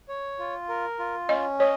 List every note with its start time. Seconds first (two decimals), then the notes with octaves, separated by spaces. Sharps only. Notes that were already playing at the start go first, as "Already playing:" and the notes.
0.09 C#5
0.39 F4
0.69 A#4
0.99 F4
1.29 C#4 D#5
1.59 C#5 D#5